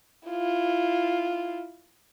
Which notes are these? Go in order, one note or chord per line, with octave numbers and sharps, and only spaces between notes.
E4 F4